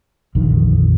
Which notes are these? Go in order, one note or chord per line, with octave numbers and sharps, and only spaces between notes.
A#1 F2 D3 D#3